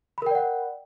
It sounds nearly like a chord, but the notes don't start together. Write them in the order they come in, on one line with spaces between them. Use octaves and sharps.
B5 A#4 G5 D5 F#5